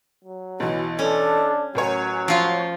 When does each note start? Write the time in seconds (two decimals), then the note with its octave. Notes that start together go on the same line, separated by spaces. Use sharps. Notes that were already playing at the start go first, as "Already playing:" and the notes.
0.25 F#3
0.60 B1 E3 F#4
0.99 C#4 D4 A4
1.75 A1 F#3 A#4 C#5 G#5
2.28 F3 F4 F5 C#6